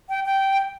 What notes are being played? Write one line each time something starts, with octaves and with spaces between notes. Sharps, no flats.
G5
G5